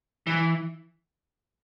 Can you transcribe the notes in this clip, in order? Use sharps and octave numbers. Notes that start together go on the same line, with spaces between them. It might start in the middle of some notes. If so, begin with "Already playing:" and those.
E3